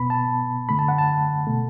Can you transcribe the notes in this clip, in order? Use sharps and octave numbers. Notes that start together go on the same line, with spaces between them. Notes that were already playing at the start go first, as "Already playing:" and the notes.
Already playing: B2 B3 B5
A5
F#2 D3 A3 B5
A5
F#5
A5
B2 A3